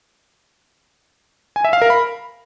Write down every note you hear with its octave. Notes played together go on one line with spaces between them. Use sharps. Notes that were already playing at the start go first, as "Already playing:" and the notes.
G#5
E5
F5
A#4
B5